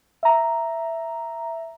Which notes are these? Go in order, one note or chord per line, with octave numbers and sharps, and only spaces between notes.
E5 A#5